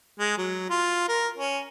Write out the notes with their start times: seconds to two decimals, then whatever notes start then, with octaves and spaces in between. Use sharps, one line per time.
0.20 G#3
0.38 F#3
0.70 F4
1.09 A#4
1.38 C#4